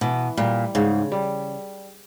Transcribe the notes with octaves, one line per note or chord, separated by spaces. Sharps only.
B2 E3
A#2 G3
G#2 C#3
G3